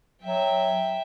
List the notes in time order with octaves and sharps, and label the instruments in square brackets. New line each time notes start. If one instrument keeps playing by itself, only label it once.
[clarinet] F#3 [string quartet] E5 G5